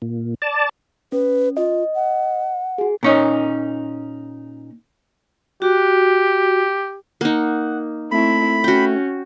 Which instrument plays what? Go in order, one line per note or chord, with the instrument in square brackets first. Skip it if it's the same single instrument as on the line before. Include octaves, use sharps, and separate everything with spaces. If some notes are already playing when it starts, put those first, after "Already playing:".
[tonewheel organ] A#2
D5 A5
[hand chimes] C#4 [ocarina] B4
[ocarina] F4 [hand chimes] D#5
[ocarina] F#5
[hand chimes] F#4 G#4
[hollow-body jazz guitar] A#2 C#4 D#4
[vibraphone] F#4 [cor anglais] G4
[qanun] A#3 D#4 [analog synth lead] F#5
[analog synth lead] A3 [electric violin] C4 E4 [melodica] B5
[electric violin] C#4 [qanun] F#4 G5